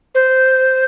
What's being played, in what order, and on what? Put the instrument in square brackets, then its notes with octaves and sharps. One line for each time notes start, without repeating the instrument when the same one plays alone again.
[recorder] C5